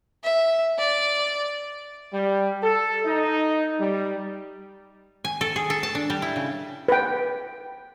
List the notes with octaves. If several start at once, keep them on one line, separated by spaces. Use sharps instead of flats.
E5
D5
G3
A4
D#4
G3
G#5
A4
G#4
A4
A5
D4
G3
E4
C#3
B4 G5